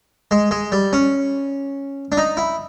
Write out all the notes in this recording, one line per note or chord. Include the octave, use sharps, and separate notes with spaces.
G#3
G#3
G3
C#4
D4
D#4
E4